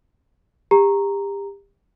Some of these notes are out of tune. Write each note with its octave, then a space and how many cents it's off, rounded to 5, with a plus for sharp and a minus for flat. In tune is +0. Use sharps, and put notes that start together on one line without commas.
G4 +30 A#5 +0